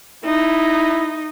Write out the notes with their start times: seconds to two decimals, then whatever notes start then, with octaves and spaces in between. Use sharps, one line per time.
0.25 D#4 E4